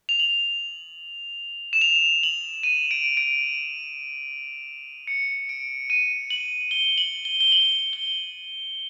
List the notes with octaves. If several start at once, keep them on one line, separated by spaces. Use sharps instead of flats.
F7
F#7
E7
F7
F#7
D#7
D7
D7
C#7
D7
D#7
F#7
G7
F#7
G7
G7
F#7
G7